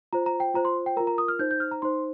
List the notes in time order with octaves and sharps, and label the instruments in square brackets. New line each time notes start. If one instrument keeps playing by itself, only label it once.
[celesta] F4 C5 A#5
A#5
G5
F4 C5 A#5
C6
G5
A#4 A#5
F4
A#5
D#6
F6
D#4 C5 G6
G6
F6
A#5
D#4 C5 C6